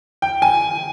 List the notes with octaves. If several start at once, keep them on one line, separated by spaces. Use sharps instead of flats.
G5
G#5